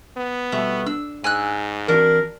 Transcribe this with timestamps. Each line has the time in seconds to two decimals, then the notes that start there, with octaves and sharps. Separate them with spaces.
0.17 B3
0.52 B2 G3 A3 E5
0.86 D4 E6
1.24 G#2 G#5 E6 F#6
1.88 E3 C4 D4 F#4 A#4